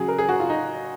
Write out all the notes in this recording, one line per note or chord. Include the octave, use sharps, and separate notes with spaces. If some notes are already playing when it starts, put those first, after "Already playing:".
Already playing: C#3 F#3 G#4
A#4
G#4
F#4
F4
D#4